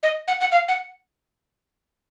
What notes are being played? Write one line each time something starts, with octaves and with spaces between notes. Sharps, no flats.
D#5
F#5
F#5
F5
F#5